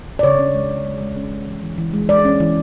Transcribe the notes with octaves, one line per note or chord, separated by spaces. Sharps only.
D5
C#3 C#5
C#4
G#3
C#3
G#3
G#3
C#4
G#3
E3
E3
E3
G#3
G#3 D5
C#4
E3